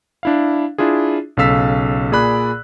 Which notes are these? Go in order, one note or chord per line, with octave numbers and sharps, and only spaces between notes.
D4 E4 F5
D4 E4 F4 G#4
B1 C#3 A4 F5 E6 B6
A#2 G#4 D5 B5 F#6